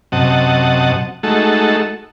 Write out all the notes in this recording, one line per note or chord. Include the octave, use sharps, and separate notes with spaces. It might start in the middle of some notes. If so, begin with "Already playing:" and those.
F#2 C3 D#5 F#5 A5
G#3 A3 D#4 F#4 A4